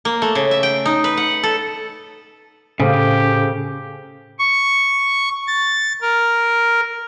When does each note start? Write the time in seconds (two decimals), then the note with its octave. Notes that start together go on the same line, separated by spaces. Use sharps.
0.05 A#3
0.22 A3
0.35 C#3
0.51 E5
0.63 G5
0.85 D#4
1.04 B4
1.17 F#5
1.43 A4
2.80 A2 C#3 G4 A4 C5 F5
4.39 C#6
5.48 A6
6.02 A#4